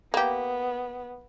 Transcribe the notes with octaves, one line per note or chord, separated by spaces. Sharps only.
A#3 B3 G4